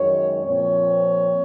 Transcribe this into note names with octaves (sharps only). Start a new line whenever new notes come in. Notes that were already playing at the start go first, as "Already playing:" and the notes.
Already playing: F#2 D#3 G#3 C#5
A#2 F3 C4 C#5